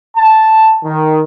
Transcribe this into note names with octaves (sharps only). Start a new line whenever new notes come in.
A5
D#3